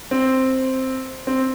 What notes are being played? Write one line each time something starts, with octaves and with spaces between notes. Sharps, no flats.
C4
C4